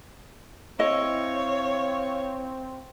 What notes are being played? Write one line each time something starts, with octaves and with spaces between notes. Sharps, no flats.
C4 E4 C#5 D#5 F5